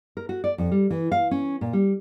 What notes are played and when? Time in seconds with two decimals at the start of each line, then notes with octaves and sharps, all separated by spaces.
0.17 A#4
0.29 F#4
0.44 D5
0.58 F2
0.71 G3
0.90 E3
1.12 F5
1.31 C#4
1.61 A#2
1.73 G3